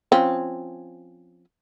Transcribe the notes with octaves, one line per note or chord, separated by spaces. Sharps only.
F3 C4 C#4